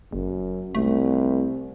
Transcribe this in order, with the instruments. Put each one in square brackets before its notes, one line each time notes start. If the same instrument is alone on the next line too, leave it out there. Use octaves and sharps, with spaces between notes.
[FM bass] F#1 [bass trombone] F#2
[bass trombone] C2 [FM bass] A3